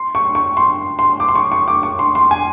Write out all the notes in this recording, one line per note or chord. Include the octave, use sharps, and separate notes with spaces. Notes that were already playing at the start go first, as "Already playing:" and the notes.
Already playing: C6
C#6
C#6
C6
C6
D6
C6
C#6
C#6
D6
C#6
C6
C6
G#5